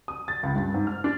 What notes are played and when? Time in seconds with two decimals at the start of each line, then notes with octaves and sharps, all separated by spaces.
0.08 D#6
0.28 A6
0.43 C#2
0.56 G2
0.74 G#2
0.87 F6
1.04 D4